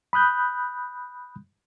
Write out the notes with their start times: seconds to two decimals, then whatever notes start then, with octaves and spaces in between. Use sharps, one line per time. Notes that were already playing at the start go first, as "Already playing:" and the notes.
0.13 B5 D#6 F#6 G6